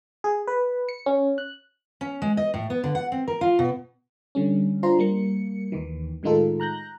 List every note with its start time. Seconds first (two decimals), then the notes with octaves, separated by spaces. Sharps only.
0.24 G#4
0.47 B4
0.89 C#7
1.06 C#4
1.38 F#6
2.01 C#4
2.22 G#3
2.37 D#5
2.54 A2
2.70 B3
2.84 D3
2.95 F#5
3.12 C4
3.28 A#4
3.41 F4
3.59 B2
4.35 D3 G3 C#4
4.83 D4 F4 C5 A#5 C6
4.99 G3 A#3 C#7
5.72 D#2 D#3 E3
6.23 A2 D#3 G#3 D#4 F4 A4
6.60 A#5 F#6 G6 A#6